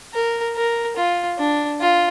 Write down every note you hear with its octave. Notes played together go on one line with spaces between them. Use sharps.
A#4
A#4
F4
D4
F4